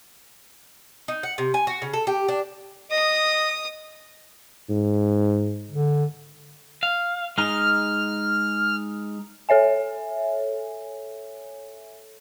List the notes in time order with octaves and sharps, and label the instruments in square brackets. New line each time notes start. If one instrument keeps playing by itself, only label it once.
[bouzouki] D#4
F#5
C3
G#5
F#4
C#3
A4
G4
D4
[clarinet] D#5 [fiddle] D#6
[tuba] G#2
[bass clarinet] D3
[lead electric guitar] F5
[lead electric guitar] G#3 D#4 [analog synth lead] F6
[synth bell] A4 C#5 E5 G#5